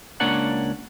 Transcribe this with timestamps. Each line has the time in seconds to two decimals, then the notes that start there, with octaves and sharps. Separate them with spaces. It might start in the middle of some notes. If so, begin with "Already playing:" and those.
0.20 C#2 A#3 D4 C#5 F#5